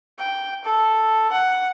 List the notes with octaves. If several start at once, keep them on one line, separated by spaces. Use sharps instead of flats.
G5
A4
F#5